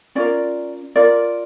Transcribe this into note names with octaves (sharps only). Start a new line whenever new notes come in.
C#4 F4 A#4 D5
F4 A#4 D5